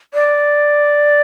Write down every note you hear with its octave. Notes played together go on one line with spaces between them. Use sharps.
D5